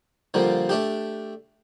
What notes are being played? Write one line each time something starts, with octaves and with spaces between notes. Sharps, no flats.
D3 F3 G3 A#3
A3 D4 G4